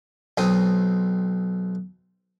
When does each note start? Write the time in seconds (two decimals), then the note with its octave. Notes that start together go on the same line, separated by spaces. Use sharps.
0.38 B1 C4 D#6